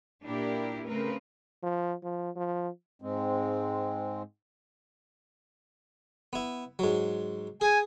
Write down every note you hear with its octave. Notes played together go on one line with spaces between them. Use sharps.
A#2 D4 E4 G4 A#4
C#3 A3 C4 A#4 B4
F3
F3
F3
G#2 G#3 C4
B3 E4
G#2 F#3
G#4 G#5